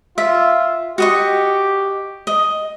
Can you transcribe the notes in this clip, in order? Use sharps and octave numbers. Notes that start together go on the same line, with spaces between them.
F4 E5
F#4 G4 D#5 C#6
D#5